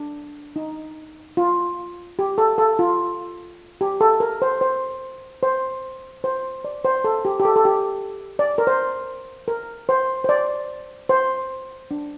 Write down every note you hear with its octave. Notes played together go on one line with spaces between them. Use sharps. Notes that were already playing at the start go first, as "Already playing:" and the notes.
Already playing: D4
D#4
F4
G4
A4
A4
F4
G4
A4
A#4
C5
C5
C5
C5
D5
C5
A4
G4
G4
A4
A4
G4
D5
A#4
C5
A#4
C5
C5
D5
C5
D4